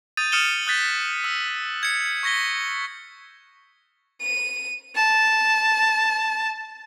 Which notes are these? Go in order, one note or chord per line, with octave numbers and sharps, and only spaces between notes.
D#6 G6 A6 D#7
D#6 F6 C#7 D#7 E7 G7
D#6 F#6 G6 A6 B6 G7
E6
G#6 C#7
C#6 G#6 A#6 B6 G7
D#7
A5